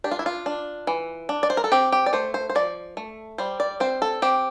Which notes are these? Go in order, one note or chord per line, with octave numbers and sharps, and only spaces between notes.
D4 G4
F4
E4
F4
D4
E3
D4
D5
C5
A#4
A4
C4 G4
G4
D5
A3 C5
C5
C5
F3 D5
A3
G3 C5
D5
C4 C5
A4
C4 G4